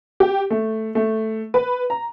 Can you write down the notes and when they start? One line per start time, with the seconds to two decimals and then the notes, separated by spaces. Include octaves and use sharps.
0.20 G4
0.50 A3
0.95 A3
1.54 B4
1.90 A#5